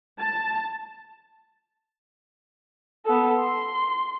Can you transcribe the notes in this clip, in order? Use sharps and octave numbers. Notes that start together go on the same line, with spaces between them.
A5
B3 A4
C6